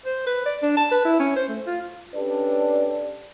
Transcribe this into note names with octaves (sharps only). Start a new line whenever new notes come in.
C5
B4
D5
D4
A5
B4
E4
C#4
C5
A3
F4
C#4 D4 G4 A4 B4 D5